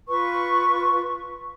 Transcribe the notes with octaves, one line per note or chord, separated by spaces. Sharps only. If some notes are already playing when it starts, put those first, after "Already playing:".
F4 B4 C#6